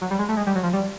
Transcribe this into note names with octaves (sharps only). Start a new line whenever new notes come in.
F#3
G3
G#3
A3
G#3
G3
F#3
F3
G3